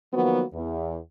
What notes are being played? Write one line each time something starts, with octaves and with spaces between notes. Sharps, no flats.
D#3 F3 F#3 A#3 B3 F#4
E2